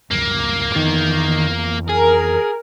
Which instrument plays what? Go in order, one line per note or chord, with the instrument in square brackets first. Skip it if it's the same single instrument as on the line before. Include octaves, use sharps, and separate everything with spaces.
[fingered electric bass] D1 C#2 F#2 [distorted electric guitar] A#3
[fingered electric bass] F2 E3 B3 [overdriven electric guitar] D#3
[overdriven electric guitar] G#4 [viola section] A#4